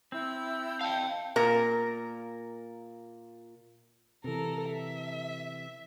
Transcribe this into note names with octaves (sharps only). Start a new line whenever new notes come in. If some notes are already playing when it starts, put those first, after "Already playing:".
C4 E4 E6 G6
F5 G5 A5
A#2 A#4
C3 E3 A4 A#4 A#5
E5